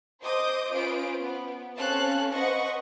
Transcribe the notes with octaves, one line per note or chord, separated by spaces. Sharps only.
C5 D#5 D6 D#6 G6
C#4 F4 B4 C5 D7
B3
C4 C#4 A4 F5 A5 F#6
B4 C5 D#5 F#5 C#6